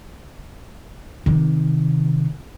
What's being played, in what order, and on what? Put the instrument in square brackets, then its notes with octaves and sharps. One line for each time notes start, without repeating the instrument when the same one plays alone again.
[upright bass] C3 D#3